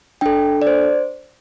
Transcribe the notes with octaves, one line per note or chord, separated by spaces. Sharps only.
D4 A4 G5
D5
C5